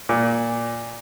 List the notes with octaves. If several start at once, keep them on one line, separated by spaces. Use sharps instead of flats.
A#2